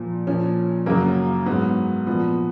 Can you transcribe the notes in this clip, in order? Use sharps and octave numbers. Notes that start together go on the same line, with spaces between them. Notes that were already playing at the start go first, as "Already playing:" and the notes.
Already playing: A#2 F3
A#2 F3 C#4
F#2 C#3 F#3 A#3
G#2 F#3 B3
A#2 F3 B3